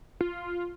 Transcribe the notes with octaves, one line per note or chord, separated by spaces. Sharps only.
F4